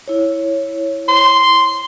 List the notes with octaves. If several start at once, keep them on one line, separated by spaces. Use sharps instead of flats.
E4 C#5
C6